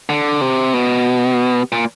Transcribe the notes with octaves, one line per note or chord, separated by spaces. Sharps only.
D3
C3
B2
A#2